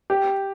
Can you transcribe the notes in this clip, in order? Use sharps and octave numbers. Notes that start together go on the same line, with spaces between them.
G4